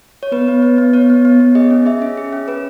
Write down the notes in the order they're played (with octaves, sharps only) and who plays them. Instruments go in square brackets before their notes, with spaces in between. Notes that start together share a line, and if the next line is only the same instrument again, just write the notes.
[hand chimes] C#5
B3 B4
B3
B3
B3
B3 C#5
B3
B3
B3
G#4 D#5
C#4
G#4 E5
C#4
G#4
C#4
C#4 B4